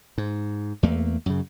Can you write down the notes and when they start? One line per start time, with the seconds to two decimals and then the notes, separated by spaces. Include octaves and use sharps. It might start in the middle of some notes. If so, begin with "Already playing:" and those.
0.18 G#2
0.83 E2 A3 A#3
1.26 F#2 C#3